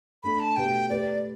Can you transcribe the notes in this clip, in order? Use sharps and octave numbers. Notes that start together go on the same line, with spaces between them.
A3 D4 A4 B5
A5
B2 A3 G4 B4 G5
A3 G4 B4 D5